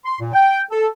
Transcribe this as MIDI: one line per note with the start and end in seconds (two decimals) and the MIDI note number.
0.05 0.19 84
0.20 0.31 46
0.34 0.61 79
0.71 0.88 69